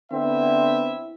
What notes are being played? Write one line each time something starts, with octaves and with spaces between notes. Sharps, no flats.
D3 B3 C4 E4 E5